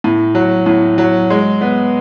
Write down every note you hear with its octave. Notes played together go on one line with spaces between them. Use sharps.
A2
F#3
A2
F#3
G#3
B3